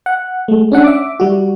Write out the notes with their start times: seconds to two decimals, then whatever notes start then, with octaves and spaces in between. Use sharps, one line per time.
0.06 F#5
0.48 G#3 A3
0.72 C#4 D4 F#5
0.84 E5 D6
1.20 G3 F#4